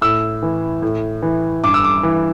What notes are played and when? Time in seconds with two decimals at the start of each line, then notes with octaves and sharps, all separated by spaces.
0.01 A2 E6
0.43 E3
0.82 A2
1.22 E3
1.64 G2 D6
1.74 E6
1.84 D6
2.03 E3